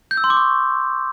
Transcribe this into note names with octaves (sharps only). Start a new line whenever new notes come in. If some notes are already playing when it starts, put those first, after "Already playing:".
G6
E6
C6
D6
C#6